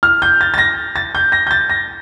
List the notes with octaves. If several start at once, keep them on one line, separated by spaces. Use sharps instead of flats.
F6
G6
A6
A6
A#6
A6
G6
A#6
G6
A6
A#6